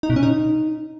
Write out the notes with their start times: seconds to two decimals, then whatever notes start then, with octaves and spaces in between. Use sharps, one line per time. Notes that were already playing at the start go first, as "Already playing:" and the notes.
0.03 D#4
0.10 B2
0.16 C#4
0.23 D#4